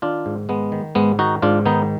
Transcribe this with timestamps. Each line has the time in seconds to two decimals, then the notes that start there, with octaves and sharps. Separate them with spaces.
0.02 D#3 D4 F4
0.26 G#2
0.49 D#3 G#3 B3
0.72 D#3
0.95 G#2 G#3 B3
1.19 D#3 D#4 F#4
1.42 G#2 D4 F4
1.66 D#3 B3 D#4